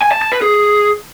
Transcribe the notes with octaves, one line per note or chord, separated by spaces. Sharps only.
G#5
A5
A5
B4
G#4